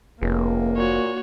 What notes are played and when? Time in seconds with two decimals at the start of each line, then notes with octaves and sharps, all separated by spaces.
0.21 F1 C#2 A#3
0.77 A#2 F#4 C#5